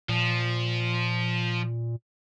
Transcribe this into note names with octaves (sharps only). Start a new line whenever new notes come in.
A#2 F3